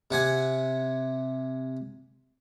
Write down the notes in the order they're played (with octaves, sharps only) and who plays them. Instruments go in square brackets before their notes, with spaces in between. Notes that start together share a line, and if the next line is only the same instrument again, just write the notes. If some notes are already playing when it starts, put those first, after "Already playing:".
[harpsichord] C3 F#5 G#5